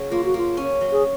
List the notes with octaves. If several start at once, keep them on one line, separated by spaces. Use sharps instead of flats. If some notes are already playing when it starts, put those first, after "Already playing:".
Already playing: C#3 F#3 C#4
A#3 F4
F#4
A#3 F4
C#4
F#3
G#4